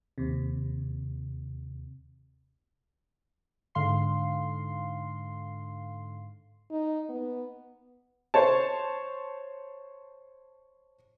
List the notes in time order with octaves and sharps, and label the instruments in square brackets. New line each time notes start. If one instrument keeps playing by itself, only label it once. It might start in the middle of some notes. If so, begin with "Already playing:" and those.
[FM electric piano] D#2 C3
[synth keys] G#2 D3 F5 C6 C7
[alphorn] D#4
B3
[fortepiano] C5 C#5 A5